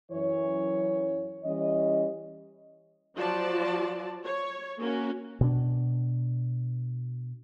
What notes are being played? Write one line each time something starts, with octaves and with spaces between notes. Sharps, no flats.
F#2 E3 C#5
E3 G3 C#4 D#5
F3 F#3 F4 F#4 D5 A5
C#5
A#3 C#4 F#4
B2 D4